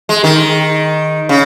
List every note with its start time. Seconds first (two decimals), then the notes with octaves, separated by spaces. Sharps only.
0.09 G#3
0.24 D#3
1.29 C#3